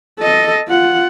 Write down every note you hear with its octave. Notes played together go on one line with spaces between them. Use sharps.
A4 D#5
F4 F#5